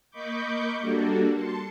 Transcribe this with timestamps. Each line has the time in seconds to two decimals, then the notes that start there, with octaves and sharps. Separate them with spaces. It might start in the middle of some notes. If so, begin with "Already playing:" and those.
0.11 A#3 D#5 B5 C#6 D6 G6
0.81 G3 A#3 D4 F#4 A4
1.33 A5 C6 C#7